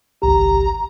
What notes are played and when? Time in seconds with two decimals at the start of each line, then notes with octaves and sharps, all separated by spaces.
0.22 G#1 C#2 G4 A#5